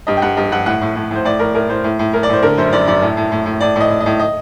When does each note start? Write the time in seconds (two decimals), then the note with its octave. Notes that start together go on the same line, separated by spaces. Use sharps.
0.07 G2 D#5
0.17 G5
0.22 G2 F#5
0.37 G2 D#5
0.52 G2 F#5
0.66 A2 F#5
0.81 A2
0.96 A2
1.11 A2 C5
1.25 A2 D5
1.39 A2 A#4
1.54 A2 A#4
1.69 A2 C5
1.84 A2
1.99 A2
2.13 A2 A#4
2.23 D5
2.29 A2 C5
2.43 D3 A#4
2.58 F#2 C5
2.72 F#2 D5
2.87 F#2 D5
3.02 A2
3.17 A2
3.32 A2
3.46 A2
3.60 A2 D5
3.76 A2 D#5
3.90 A2
4.00 D#5
4.06 A2
4.19 D#5